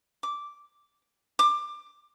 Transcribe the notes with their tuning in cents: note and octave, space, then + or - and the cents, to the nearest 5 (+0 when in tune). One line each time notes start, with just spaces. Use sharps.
D6 -5
D6 +20